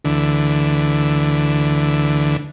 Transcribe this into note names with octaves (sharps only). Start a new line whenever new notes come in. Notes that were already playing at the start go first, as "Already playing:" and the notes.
D2 D3 E3